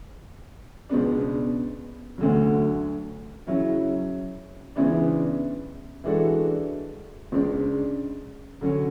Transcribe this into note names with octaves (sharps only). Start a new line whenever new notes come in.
C#2 B2 G#3 B3 D4
D2 D3 F#3
C#3 F#3 C#4 E4
C#2 C#3 E3 B3 D4
E3 G#3 D4 F#4 A4
C#2 C#3 G#3 D4
D3 F#3 C#4